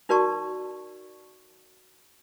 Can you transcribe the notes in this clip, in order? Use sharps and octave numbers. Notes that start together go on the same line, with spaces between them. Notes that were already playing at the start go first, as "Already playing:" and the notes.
D#4 F#4 A#4 D5 A5 C#6